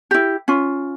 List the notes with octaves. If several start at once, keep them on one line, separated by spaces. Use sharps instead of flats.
E4 G4
C#4 F4